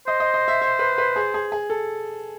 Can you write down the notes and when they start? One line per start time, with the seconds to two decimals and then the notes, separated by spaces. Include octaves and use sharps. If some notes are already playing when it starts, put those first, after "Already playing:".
0.07 C5 D#5
0.20 D#5
0.34 D#5
0.48 E5
0.62 E5
0.79 B4
0.98 B4
1.16 G#4
1.34 G#4
1.52 G#4
1.70 A4